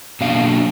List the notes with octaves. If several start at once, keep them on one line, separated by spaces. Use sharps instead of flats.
B2 F#3 A#3 D4 F5